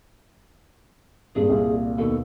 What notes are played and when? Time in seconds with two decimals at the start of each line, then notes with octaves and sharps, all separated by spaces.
1.35 G#1 G2 A#2 G#4
1.50 C2 A#2
1.98 D#2 B2 A4